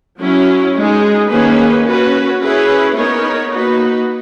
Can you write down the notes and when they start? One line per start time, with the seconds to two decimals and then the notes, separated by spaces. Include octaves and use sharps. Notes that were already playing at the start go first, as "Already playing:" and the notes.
0.19 F#3 C#4 E4
0.74 G#3 D#4 G#4
1.29 D#3 A#3 C#4 G#4 B4
1.86 C#4 F#4 B4
2.41 C#4 E4 G#4 B4
2.96 B3 D#4 A#4 C#5
3.52 A#3 D#4 F#4 B4